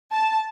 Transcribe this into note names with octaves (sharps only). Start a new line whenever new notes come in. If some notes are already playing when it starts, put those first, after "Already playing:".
A5